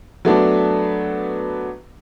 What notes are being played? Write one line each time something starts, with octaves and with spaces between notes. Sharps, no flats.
F#3 A3 B3 D4